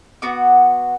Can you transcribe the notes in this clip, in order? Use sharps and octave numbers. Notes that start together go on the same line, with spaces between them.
B3 F#4 D6